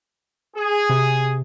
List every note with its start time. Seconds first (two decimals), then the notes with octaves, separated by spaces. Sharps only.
0.56 G#4
0.90 C3